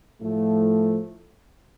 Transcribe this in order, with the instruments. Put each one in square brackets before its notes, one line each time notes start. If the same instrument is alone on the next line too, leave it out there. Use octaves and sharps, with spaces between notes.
[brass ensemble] A2 F3 A3